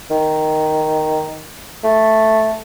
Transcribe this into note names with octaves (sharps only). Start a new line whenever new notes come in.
D#3
A3